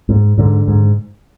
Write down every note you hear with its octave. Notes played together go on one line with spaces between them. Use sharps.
G#2
G#2 D3
G#2